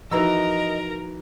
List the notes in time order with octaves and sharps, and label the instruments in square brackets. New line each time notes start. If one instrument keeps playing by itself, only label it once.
[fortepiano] E3 A#5 E6 [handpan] F3 D#4 F#4 [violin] A#4 [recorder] D#5